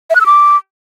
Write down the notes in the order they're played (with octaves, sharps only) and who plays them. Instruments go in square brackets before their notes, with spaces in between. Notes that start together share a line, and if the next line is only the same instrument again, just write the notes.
[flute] E5
F#6
E6
D6